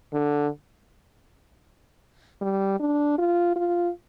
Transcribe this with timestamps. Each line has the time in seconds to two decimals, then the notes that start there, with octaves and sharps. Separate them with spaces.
0.13 D3
2.41 G3
2.80 D4
3.18 F4
3.56 F4